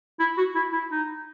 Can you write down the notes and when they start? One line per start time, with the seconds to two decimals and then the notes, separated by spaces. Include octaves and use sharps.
0.19 E4
0.37 F#4
0.55 E4
0.73 E4
0.91 D#4